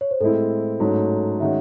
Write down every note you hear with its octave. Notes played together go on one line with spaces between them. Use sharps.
C#5
C5
A2 G#3 C4 E4 A4
G#2 F#3 A3 C#4
D#3 G#3 C#4 F#4 E5